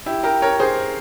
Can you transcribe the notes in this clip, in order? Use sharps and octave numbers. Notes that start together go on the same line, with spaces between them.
E4 G4
G4 A#4
A#4 C#5
G#4 C5